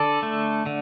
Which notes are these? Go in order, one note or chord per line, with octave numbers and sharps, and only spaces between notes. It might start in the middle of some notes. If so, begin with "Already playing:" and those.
Already playing: D3 A4 D5
A3
D3